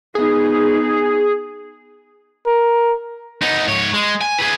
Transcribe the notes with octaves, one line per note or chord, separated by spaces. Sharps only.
B3 D#4 G#4
A#4
B3 D#4
G#2 C#5
G#3
G#5
G#4 B4